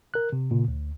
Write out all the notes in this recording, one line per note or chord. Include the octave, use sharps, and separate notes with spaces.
A#4 F#6
C3
A#2 C#3
D2